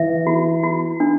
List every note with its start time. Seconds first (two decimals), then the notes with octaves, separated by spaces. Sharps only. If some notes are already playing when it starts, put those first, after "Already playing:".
Already playing: E3 E5
0.27 F#4
0.64 F#4
1.00 D4